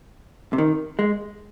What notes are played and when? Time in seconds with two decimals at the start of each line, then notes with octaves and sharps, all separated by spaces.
0.53 C3
0.58 D#3
0.99 G#3